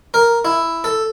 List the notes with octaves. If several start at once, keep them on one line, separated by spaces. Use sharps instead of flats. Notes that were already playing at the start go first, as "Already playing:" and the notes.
A#4
E4
A4